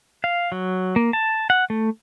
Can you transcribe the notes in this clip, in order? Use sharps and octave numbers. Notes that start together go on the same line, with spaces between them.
F5
F#3
A#3
A5
F#5
A3